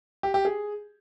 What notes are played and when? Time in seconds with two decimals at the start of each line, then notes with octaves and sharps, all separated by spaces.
0.23 G4
0.34 G4
0.45 G#4